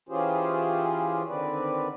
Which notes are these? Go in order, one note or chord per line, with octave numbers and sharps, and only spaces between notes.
E3 C#4 F4 G4 G#4 C5
D3 D#3 C4 B4 D5